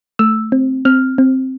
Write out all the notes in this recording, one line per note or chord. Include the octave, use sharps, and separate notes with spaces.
A3 E6
C4
C4 F6
C4